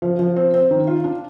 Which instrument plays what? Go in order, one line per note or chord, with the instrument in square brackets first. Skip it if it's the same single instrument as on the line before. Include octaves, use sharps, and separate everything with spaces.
[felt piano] F3
F3
C4
C4
D#3
F4
D4